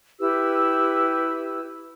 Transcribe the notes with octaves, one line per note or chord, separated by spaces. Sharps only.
E4 G4 B4 E6